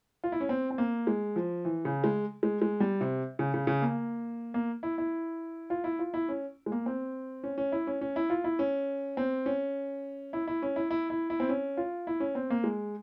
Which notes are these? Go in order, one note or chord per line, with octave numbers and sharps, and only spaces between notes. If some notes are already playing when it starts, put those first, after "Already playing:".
F4
E4
C#4
C4
C4
A#3
G#3
F3
E3
C#3
G#3
G#3
G#3
G3
C3
C#3
C#3
C#3
A#3
A#3
E4
E4
F4
E4
F4
E4
C#4
G#3
A#3
C4
C#4
C#4
E4
C#4
C#4
E4
F4
E4
C#4
C4
C#4
E4
E4
C#4
E4
E4
E4
E4
C4
C#4
F4
E4
C#4
C4
A#3
G#3